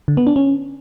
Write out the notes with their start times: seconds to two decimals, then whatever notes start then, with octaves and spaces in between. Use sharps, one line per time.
0.08 D3
0.17 B3
0.27 D4
0.36 C#4